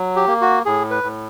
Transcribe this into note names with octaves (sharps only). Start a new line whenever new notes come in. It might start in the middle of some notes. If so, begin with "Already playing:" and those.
Already playing: F#3
G4
A#3
F#4
A2 G#4
B4
A2